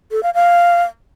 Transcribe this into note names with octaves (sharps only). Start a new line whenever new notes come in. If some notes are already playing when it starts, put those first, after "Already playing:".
A4
F5
F5